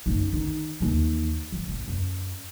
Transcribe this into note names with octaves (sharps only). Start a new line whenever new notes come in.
F#2 D#4
D#3 D#4
D#2 E3
F3
A1
F#2